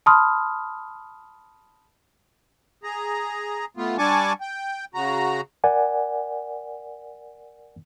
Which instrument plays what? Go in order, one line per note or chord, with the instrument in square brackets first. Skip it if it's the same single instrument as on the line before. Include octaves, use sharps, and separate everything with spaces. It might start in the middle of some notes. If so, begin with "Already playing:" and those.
[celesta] A5 B5 C6 D#6 F6
[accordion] G#4 A#5
A3 B3 F4
G3 D4 G#5 A5 C#6 D6
G5
C#3 F#4 A#5
[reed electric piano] A#4 D5 F#5 G#5